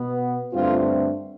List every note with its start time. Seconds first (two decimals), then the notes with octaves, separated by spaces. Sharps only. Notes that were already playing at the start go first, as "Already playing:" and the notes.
Already playing: B2 B3
0.54 G2 D3 A3 C4 F4